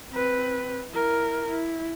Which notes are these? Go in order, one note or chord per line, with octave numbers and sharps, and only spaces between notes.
C4 B4
E4 A#4
E4